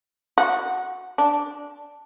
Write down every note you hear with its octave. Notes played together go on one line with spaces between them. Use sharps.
F#4
D4